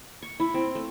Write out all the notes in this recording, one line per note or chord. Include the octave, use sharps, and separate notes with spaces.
C#6
E4
C4
A3